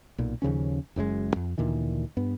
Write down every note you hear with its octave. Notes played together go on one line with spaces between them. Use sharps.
B1 A#2
D#2 C#3 F3 C#4
F#1 F#2 A2 G#3
F2
D2 A#2 D#3 E3
G2 B3